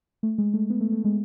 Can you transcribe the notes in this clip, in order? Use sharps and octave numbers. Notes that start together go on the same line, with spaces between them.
A3
G#3
A3
B3
A3
A3
G#3